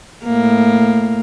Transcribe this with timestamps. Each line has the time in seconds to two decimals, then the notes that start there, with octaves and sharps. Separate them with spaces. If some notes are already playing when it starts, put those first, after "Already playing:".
0.25 A2 A#3